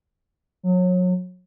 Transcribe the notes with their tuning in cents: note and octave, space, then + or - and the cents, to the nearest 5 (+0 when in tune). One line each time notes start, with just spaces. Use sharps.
F#3 -30